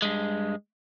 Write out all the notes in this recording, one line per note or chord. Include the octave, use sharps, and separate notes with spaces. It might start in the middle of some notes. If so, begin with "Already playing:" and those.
G2 G#3